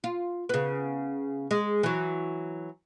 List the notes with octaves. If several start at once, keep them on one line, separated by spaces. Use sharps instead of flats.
F4
C#3 B3
G#3
E3 F#3